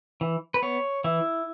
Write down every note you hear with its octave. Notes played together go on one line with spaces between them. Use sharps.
E3
B4
B3 C#5
E3 E4